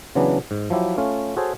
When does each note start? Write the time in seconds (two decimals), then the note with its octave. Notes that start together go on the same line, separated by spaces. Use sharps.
0.15 C#3 E3 F#3 B3 D4
0.51 G#2
0.70 F3 F#3 E4 G4
0.98 A3 C#4 F4
1.37 F#4 G#4 A4 C5 C#5